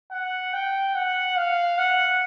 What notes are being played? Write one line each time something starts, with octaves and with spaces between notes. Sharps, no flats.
F#5
G5
F#5
F5
F#5